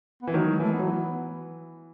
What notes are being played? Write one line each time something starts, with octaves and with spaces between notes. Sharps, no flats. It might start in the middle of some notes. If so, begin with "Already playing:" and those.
E3 B3
D#3 F#3 A3
G#3
E3 A3
B3
F#3
E3